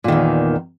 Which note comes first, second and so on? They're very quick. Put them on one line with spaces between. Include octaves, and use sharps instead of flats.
A#2 D#3 E2